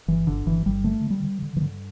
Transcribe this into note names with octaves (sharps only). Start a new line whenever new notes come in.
G1 E3
G1 D3
G1 E3
G1 G3
D3 A3
D3
G3
D3
D3
E3
G2 D3